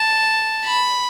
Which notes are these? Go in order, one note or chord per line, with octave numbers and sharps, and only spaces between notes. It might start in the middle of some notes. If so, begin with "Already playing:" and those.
Already playing: A5
B5